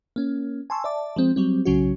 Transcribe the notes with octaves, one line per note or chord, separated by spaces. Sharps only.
A#3 C#4
G#5 A5 C6 C#6 E6
D5 E5 A5 D6
F3 G#3 C4
F#3 G3 C4
B1 C#3 F#3 C#4 F#4